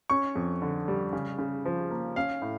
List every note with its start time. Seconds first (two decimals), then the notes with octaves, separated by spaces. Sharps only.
0.10 C#4 C#6
0.35 F2
0.62 D3
0.88 G3
1.13 C#3
1.38 C#3
1.65 F3
1.90 A#3
2.16 C#4 F5
2.42 A2